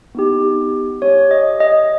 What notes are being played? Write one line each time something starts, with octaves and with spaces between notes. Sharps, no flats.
B3 D#4 G4
C#4 G4 C#5
D#5
D#5